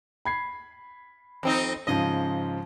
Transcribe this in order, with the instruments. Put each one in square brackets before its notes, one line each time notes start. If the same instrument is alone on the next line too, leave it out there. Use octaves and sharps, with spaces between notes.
[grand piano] B5 G#6 C7
[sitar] F2 C4 D#4
[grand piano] G#2 C#3 F3 [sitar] D#5